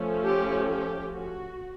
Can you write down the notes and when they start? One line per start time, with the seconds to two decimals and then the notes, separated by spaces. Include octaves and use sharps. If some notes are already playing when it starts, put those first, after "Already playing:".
Already playing: F3 A3 C#4
0.23 G4
0.68 G4
1.13 F#4